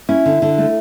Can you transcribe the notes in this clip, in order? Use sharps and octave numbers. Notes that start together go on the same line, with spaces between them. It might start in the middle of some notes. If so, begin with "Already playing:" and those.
C#4 E4
D3
D3
A3